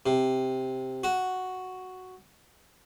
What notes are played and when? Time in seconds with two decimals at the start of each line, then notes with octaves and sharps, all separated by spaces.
0.06 C3
1.04 F#4